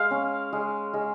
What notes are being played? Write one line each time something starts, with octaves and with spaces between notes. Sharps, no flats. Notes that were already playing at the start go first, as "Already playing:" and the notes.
Already playing: G#3 F5
C#4
G#3
G#3